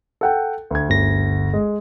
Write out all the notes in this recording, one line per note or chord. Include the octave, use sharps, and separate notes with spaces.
A4 F#5 G5
D2 G#6
G1 A#6
G#3